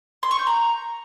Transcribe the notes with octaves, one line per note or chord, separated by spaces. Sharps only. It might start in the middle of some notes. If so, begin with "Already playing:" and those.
C6
C#6
G6
A#5